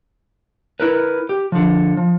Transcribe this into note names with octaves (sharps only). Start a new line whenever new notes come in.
E4 A#4 B4
G4
D3 F3
F3